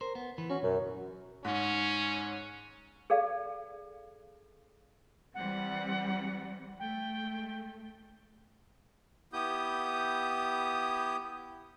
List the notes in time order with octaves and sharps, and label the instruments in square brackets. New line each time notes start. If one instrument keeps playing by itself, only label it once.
[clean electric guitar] A#4 C5
B3
E3 B4
[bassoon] C#4 [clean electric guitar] F#4
[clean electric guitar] B1 [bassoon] F#2
[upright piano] G#2 [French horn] C#4
[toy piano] G#4 A4 D5 F5
[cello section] E3 G3 C4 [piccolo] F#5
[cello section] A3 [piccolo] G5
[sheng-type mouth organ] B3 E4 G4 D#6 G6